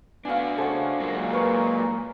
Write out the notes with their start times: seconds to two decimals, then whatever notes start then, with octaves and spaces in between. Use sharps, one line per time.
0.25 B3 D4 F#4 F5 G#5
0.58 C#3 A4 C5 C#5 F#5 G#5
1.00 A#2 F#3 G#3 A#3
1.33 A#4 B4 C#6